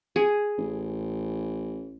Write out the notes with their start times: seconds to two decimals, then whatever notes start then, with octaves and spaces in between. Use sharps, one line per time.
0.16 G#4
0.58 A1